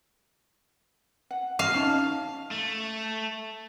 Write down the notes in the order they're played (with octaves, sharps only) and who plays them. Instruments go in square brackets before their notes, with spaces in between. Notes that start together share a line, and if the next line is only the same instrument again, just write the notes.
[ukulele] F#5
[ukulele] F#4 [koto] F5
[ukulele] C#4 D#4 A5
[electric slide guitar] A3